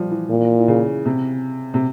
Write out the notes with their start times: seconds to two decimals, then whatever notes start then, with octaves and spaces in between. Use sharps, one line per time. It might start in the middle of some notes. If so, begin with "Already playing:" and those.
Already playing: F3 G3
0.11 E3
0.30 A#2
0.59 E3
0.68 C#3
1.05 C3
1.74 C3